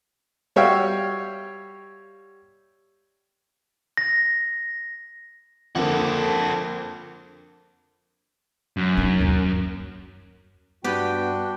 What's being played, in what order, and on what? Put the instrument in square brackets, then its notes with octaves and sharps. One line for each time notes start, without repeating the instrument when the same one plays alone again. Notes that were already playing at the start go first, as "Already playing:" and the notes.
[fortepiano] G3 F#4 C#5 E5 F5 G5
[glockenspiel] A#6
[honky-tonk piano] F2 D3 A#3 [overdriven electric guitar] F#4 A4
[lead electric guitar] F#2
[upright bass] C#4 D#4
D#2
[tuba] G2 [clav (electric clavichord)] B3 B4 [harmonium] D4 F#4 G5 [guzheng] G4